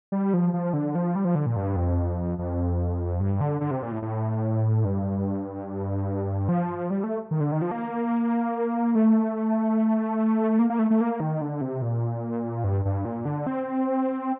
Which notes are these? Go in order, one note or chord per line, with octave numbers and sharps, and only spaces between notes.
G3
F3
F3
D3
F3
G3
F3
D3
A#2
G2
F2
F2
G2
D3
D3
C3
A#2
A2
A2
G2
F3
G3
A3
D#3
D3
D#3
F3
A#3
A3
A#3
A#3
A3
A3
A#3
D#3
D3
C3
A#2
G2
G2
A#2
D3
C4